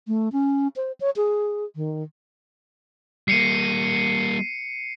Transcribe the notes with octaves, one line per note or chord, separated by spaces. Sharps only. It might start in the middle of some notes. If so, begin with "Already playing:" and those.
A3
C#4
C5
C#5
G#4
D#3
G3 A#3 C7 C#7 D#7